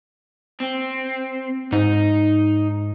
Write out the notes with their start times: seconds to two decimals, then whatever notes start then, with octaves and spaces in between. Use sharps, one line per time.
0.60 C4
1.72 G#2 D#4